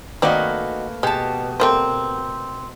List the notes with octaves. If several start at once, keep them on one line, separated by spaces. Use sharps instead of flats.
D#3 A3 A#3 C4 F#4 B4 D5 D#5
B2 G#3 G4 A5
G3 A3 A#3 C4 C5